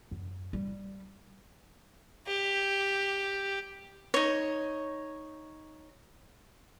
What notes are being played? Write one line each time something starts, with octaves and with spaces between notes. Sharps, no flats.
F#2
G3
G4
D#4 C#5